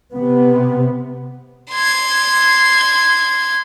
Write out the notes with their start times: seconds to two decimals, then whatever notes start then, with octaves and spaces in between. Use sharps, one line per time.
0.13 C3 B3
1.71 C6 G#6